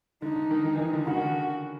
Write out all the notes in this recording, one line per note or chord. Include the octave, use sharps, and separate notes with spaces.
D3 D#4
D3
D#3
D#3
E3
D#3
D3
C#3 F#4
D#3
D3